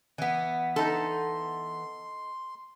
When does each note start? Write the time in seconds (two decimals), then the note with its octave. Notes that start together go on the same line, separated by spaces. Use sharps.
0.18 E3 B3
0.76 D#4 A4 C6